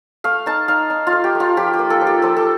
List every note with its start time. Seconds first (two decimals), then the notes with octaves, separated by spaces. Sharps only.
0.24 A3 F5
0.46 D#4 A5
0.68 D#4 F5
0.90 D#4
1.07 F4
1.13 A3
1.24 G4
1.35 A3
1.40 F4
1.57 F3 G4
1.73 G4
1.79 A#3
1.90 A4
2.01 F3
2.07 G4
2.22 F3 A4
2.37 A4